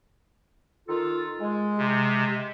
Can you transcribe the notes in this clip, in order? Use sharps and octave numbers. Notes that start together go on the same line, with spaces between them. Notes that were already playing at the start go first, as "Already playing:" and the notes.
D#3 F4 A4
G#3
C3